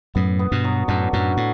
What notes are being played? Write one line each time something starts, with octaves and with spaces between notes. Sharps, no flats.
F#2 A2 B3
B3
G2 B2
F#3
F#2 A2 D3
F#2 A2 F#3
A2